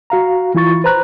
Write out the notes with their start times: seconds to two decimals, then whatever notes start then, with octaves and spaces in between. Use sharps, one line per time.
0.10 F#4 F5 A#5
0.55 E3 E4 F4 C#6 A6
0.84 B4 C5 A#5 F#6